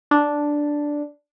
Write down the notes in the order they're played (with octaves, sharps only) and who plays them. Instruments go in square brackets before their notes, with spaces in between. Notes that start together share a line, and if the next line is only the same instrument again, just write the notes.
[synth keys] D4